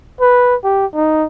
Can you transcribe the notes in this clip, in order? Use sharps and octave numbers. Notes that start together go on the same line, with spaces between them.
B4
G4
D#4